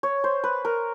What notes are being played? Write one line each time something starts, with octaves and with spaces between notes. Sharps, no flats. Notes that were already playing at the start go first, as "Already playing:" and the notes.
C#5
C5
B4
A#4